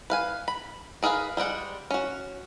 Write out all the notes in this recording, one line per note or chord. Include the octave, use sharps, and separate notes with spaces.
B4 F5 G#5
B5
D4 G#4 A#4 B4 F5
G3 G#3 D5 F#5
C#4 F#4